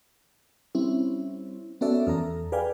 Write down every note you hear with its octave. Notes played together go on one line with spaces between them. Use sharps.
G3 C4 C#4 E4
B3 C#4 F#4 A4 D5 E5
E2 A4 A#5
G#4 B4 D5 F5 G5 G#5